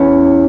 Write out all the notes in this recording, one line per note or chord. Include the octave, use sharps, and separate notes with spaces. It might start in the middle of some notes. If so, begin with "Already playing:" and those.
Already playing: E2 C#4